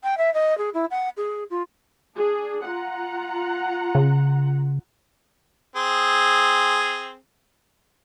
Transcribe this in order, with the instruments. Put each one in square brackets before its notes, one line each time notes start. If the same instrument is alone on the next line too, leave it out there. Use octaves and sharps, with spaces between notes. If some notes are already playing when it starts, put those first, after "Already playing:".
[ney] G5
E5
D#5
G#4
E4
F#5
G#4
F4
[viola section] D4 G#4
F4 F#5 A#5
[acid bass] C#3
[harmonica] C4 G#4